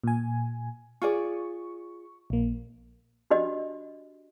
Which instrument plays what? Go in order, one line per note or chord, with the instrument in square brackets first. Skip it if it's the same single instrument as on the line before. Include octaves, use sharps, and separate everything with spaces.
[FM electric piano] A#2 G#5
[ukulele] F4 G#4 D5 [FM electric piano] C#6
[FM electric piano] A#1 A#3
[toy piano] D4 F#4 G4 D#5